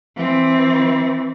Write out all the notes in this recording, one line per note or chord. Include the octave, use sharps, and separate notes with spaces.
E3 C4